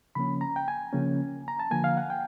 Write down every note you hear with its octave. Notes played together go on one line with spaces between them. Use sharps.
C#3 F3 A#3 C#4 B5
A#5
G5
G#5
C#3 F3 A#3 C#4
A#5
A5
D3 F3 A#3 G#5
F5
F#5
G5